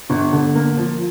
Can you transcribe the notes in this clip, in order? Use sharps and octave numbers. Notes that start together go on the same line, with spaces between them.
G1
D3
A#3
F3